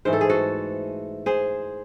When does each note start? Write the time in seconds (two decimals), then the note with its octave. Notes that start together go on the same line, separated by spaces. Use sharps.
0.05 G#2 E3 A3 C5
0.13 A4
0.21 G#4
0.30 F#4 A4
1.26 G#4 C5